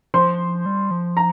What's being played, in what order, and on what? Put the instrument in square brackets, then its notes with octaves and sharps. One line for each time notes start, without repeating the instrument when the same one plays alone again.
[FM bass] F3 [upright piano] C5 C6
[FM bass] G3
F3
[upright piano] A#5